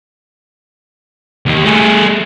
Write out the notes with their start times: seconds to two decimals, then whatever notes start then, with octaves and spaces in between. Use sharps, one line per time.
1.46 D#2 G4
1.65 A3 G#4